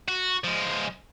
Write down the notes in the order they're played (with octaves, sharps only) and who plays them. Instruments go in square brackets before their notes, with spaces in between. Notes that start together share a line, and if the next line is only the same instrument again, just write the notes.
[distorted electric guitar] F#4
F3 G#3